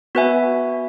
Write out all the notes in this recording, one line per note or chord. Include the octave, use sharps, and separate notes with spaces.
B3 F#4 B4 E5 G#5